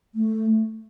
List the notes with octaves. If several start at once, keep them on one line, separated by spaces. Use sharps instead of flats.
A3